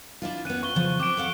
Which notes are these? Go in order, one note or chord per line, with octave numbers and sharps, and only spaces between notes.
D4 E4 F4
B3 C#4 F#6 D#7
E4 F4 C#6 G7
C#3 F3
C4 D6 D7
A4 F5 F#5